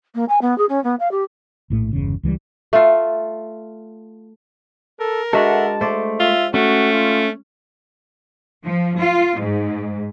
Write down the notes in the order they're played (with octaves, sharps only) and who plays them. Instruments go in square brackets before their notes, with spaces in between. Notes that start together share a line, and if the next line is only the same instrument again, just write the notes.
[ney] A#3
G#5
B3
G#4
C#4
B3
F5
G4
[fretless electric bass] A#1 A2 A3
G1 E2 C#3
C#2 E3 F#3 G3
[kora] A3 F4
[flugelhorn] A4 [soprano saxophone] A#4
[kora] G#3 D4 F#4 [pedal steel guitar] A4 E5 F#5 [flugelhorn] A5
[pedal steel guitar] A3 [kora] C5 D5
[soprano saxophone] F4 [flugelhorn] E5
[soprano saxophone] A3 [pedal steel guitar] C#4 [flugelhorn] F#4
[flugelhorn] F4
[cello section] F3
F4
G#2